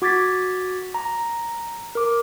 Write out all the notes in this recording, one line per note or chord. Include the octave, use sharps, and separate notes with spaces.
F#4 D6 G#6 A6 B6
A#5
A#4 D6